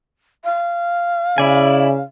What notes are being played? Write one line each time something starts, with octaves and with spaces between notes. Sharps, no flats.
F5
C#3 E4 D5 G#5